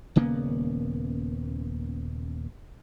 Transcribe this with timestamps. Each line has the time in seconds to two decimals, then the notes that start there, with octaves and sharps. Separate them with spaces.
0.16 D#1 C#3 A#3 B3